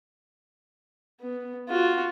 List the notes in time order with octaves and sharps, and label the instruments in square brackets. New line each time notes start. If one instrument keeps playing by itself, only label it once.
[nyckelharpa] B3
F4 F#4